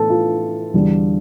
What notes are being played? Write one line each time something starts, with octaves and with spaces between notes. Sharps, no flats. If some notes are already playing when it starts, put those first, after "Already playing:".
Already playing: A2 E3 B3 D4 A4
F4
E2 D3 G3 D4